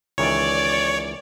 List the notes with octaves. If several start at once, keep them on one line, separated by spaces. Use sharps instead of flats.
C#2 D#3 E3 C#5 D5